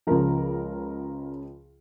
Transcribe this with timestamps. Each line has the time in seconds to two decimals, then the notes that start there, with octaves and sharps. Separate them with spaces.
0.07 C#2 C#3 F3 A#4